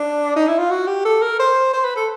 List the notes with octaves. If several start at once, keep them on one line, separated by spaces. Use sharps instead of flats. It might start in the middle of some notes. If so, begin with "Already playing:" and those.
Already playing: D4
D#4
E4
F4
F#4
G4
A4
A#4
C5
C5
B4
A4